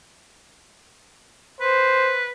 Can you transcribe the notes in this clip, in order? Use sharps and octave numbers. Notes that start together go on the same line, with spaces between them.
B4 C5